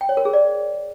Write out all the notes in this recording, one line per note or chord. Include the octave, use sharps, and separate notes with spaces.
G5
C#5
A#4
G#4
D5